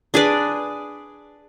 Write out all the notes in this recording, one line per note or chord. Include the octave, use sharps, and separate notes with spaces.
D4 G#4 B4 D5